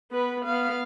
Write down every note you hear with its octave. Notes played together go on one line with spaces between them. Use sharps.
B3 B4
B3 F5